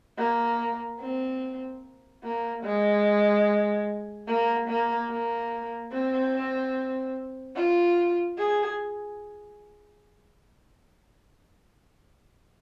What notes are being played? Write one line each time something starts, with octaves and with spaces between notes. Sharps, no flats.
A#3
C4
A#3
G#3
A#3
A#3
A#3
C4
F4
G#4